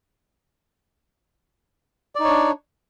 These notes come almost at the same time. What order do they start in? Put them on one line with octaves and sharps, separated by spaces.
D5 D#4 C#5 D4